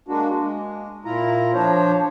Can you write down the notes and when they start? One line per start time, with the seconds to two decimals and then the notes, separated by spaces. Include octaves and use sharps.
0.08 G#3 A#3 D4 F#4
0.40 G#3
1.05 A#2 E4 F4 A#5
1.54 F3 D4 C5 C#5